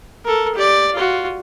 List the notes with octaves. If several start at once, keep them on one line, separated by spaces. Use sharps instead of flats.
A4 A#4
G4 D5
F4 F#4